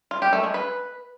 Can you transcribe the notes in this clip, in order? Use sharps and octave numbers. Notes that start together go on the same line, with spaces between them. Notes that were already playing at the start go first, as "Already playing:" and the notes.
F4
G4
A3
G#3
B4